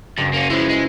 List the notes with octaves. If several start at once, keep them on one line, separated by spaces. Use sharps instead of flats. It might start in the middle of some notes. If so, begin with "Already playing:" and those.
F#1 G2
A#3 C#4
F3 G#3 E4 B4 C5
G#3